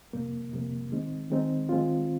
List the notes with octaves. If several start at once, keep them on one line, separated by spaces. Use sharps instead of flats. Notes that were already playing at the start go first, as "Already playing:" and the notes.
F2 C3 G3 A#3
F2 C3 G3 A#3
D#3 G#3 C4 D#4
D#3 G#3 C4 D#4
D#3 G#3 C4 F4